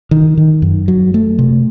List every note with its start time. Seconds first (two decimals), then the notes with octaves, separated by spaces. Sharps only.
0.11 D#3
0.37 D#3
0.62 F#2
0.88 F#3
1.14 A3
1.39 C3